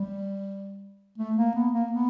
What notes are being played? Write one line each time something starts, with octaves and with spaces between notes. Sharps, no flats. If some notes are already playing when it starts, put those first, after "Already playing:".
Already playing: G3
A3
A#3
B3
A#3
B3